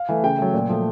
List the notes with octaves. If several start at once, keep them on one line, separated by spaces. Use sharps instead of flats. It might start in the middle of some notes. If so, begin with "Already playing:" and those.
Already playing: F5
E3 A3
C#3 G5
F#3 A3
A#2
F3 A3